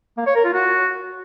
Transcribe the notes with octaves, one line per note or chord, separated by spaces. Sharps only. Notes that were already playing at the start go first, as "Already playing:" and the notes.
A#3
C#5
A#4
F4
F#4